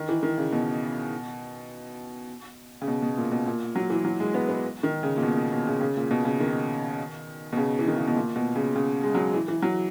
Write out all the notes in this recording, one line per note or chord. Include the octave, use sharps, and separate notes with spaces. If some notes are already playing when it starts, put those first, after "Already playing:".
Already playing: D#3
E3
D#3
C#3
B2
C#3
B2
B2
A#2
B2
A#2
F#3
E3
F#3
G#3
B3
B3
D#3
C#3
A#2
B2
B2
B2
C#3
C#3
A#2
B2
C#3
D#3
B2
C#3
E3
D#3
C#3
B2
A#2
B2
C#3
C#3
G#3
F#3
E3
E3
F#3